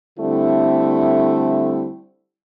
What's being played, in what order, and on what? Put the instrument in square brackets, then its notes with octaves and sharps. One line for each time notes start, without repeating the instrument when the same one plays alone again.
[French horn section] D3 G3 A3 C4 E4